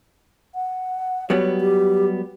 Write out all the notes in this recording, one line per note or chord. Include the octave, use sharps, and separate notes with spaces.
F#5
F#3 G3 B3 C#5
G4